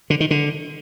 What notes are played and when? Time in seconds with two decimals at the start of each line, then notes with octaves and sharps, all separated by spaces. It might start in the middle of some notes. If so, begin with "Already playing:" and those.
0.10 D3
0.20 D#3
0.31 D3